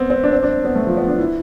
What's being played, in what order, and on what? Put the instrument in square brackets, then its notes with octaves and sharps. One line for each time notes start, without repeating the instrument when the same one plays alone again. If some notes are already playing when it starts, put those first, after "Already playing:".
Already playing: [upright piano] B3 C4
C4
D4
C4
D4
B3
A3
F3
B3
D4
E4